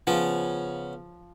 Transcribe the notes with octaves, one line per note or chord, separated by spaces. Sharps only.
C#3 F3 B3